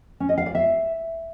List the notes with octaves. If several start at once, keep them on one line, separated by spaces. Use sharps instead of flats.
C#4
D#5
F5
D5
E5